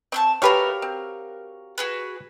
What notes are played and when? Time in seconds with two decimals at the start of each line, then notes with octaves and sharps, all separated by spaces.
0.12 C4 A5 C6 C#6
0.42 A3 F#4 G4 A#4 B4 C#5 F5
0.82 C4
1.78 F#4 G#4 B4